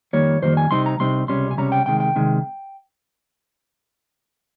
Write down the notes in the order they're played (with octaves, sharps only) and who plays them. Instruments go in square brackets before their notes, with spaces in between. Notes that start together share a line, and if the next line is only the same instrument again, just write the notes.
[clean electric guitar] F2 D#3 G3 A#3 C#5
F2 D#3 G3 A#3 C5
G#5
C2 C3 G3 C4 D#4 C6
A#5
C2 C3 G3 C4 D#4 C6
C#2 C3 G3 C#4 C6
G#5
C#2 C3 G3 C#4 A#5
G5
C2 C3 D#3 G#3 G5
G5
C2 C3 D#3 G#3